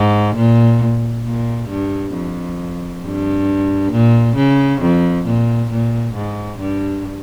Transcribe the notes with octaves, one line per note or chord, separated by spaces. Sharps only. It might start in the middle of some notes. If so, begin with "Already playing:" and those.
Already playing: G#2
A#2
A#2
G2
F2
G2
A#2
C#3
F2
A#2
A#2
G#2
G2